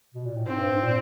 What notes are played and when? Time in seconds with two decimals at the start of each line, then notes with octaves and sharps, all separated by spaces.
0.14 B2
0.25 A#2
0.36 A2
0.46 G#2 C4
0.58 G2
0.70 G#2
0.82 A#2